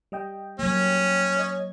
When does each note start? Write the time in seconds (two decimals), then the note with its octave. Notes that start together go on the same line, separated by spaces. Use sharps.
0.12 G3 D#5 G5
0.59 F#3 A#3 C#4
1.37 C#5 D#5 G#6